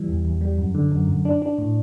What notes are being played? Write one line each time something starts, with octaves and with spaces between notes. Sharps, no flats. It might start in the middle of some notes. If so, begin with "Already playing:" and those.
Already playing: E3 G3
E2
E2
G3
F#2
D3
F#2
F#2
D4
D4
A2